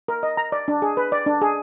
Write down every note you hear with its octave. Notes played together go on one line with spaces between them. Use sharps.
A#4
D#5
A#5
D5
D4
G#4
B4
D5
D4
G#4